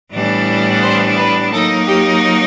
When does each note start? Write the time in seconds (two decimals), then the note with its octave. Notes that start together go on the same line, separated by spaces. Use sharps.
0.12 A2 E3 G3 B3 D4
0.82 C5
1.17 B4
1.52 F#3 A#3 D#4 A4
1.87 G4